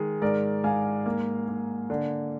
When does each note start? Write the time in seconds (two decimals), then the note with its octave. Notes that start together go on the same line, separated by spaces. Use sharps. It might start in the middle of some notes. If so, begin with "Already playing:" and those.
Already playing: D#3 G#3 G#4
0.22 G#2 A#4 D5
0.64 G#2 F5 G#5
1.06 A#3
1.48 A#3
1.90 D3